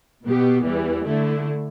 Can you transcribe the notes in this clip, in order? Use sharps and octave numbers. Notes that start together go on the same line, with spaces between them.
B2 B3 G4
E2 E3 G3
D3 A3 E4